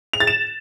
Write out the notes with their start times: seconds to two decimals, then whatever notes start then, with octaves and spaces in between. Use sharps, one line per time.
0.13 F7
0.20 A6
0.27 E7